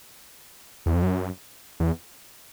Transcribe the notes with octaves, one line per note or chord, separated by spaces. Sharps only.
E2
F2
F#2
E2